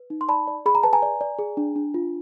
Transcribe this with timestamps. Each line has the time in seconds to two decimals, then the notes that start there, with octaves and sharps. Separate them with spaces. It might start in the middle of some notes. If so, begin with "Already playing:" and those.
Already playing: B4
0.10 D#4
0.21 C6
0.29 D5 A5 B5
0.47 D5
0.66 G#4 B5
0.75 A#5
0.83 B4 A5
0.93 G#5 A#5
1.02 D5
1.21 D5
1.39 G#4
1.57 D4
1.76 D4
1.94 F4